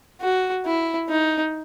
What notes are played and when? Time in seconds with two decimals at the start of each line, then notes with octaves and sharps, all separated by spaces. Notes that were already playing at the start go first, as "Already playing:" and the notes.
0.21 F#4
0.65 E4
1.09 D#4